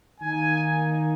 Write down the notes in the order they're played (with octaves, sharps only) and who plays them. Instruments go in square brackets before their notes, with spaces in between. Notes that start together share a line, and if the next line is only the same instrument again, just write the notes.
[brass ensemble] D#3 A#3 D#4 G#5